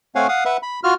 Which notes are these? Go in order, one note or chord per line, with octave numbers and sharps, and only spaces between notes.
A3 C4 C#5 F5 F#5 G#5
F5 F#5 D#6
B4 E5 F#5
B5
F4 F#4 F6